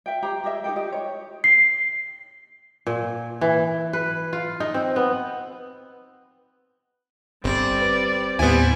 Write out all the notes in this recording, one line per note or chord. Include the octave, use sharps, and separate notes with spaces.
E5 G5
G4 C5 A#5
G4 G#4 D#5 E5
D#4 G4 A4 G5
G4 D#5
C#5
C7
A#2
E3
B4
F4
D#4
C4
B3
G1 G3 C4 D5
B4
D#2 A2 G3 B3 C4 E4 G#5